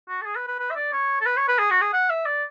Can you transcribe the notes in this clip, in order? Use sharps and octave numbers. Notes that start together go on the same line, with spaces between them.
F#4
A4
G#4
B4
B4
B4
E5
D5
C#5
A4
B4
C#5
B4
G#4
F#4
G#4
F#5
E5
D5